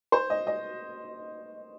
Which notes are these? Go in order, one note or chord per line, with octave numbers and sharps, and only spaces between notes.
C5
D#5
D#5